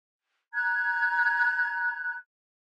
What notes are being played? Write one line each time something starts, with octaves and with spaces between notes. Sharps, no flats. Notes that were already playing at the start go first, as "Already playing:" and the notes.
A#5 F#6 G#6